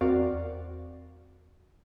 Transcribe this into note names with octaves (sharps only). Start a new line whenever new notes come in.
E2 C4 F#4 A#4 D5 F5